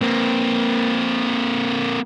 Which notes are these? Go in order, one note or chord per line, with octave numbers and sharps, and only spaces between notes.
A#3 C4